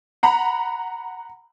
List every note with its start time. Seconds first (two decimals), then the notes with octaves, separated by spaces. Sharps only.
0.23 F#5 A#5 B5